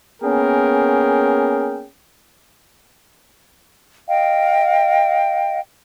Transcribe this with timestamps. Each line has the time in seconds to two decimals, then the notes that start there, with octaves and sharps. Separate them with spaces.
0.23 A#3 B3 C#4 G#4 A#4 G5
4.07 D#5 F5 G5